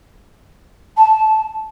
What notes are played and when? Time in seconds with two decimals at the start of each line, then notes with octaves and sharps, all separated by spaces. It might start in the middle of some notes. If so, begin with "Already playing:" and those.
0.97 A5